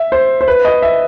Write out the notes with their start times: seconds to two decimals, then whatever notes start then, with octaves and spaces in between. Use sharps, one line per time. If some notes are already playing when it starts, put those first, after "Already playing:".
Already playing: E5
0.12 C5
0.41 C5
0.48 B4
0.65 D#5
0.82 E5